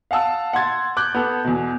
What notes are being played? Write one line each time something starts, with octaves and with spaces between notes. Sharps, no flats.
F5 F#5 A5 E6
F#5 C6 G#6 A6
D6 F#6 G6
B3 A4
E2 B2